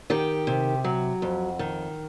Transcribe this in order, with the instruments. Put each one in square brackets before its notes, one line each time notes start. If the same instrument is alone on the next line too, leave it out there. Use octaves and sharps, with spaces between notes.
[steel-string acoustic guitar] D#3 G4
C3
F#3
F2
D#3